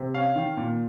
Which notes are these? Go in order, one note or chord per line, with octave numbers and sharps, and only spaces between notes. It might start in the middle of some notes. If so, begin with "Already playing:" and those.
Already playing: C3
C#4 F5
D#3
A#2